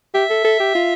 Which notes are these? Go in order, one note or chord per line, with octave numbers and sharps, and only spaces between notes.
G4 E5
A4
A4
G4
F4